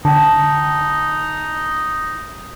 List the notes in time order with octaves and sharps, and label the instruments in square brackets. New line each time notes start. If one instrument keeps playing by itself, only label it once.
[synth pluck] D3 [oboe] D#4 [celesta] G5 A5